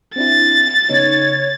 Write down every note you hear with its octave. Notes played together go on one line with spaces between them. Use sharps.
C4 D4 E4 A6
C#3 B3 D#4 C#5